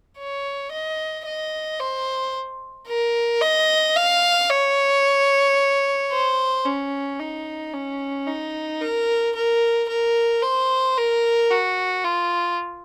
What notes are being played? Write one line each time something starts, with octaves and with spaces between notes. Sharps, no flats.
C#5
D#5
D#5
C5
A#4
D#5
F5
C#5
C5
C#4
D#4
C#4
D#4
A#4
A#4
A#4
C5
A#4
F#4
F4